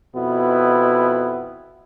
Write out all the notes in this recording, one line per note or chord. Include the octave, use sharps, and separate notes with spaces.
F2 B2 B3 E4